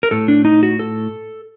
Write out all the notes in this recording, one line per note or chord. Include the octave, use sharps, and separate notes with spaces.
A#4
A2 A4
D4
D#4
F#4
A4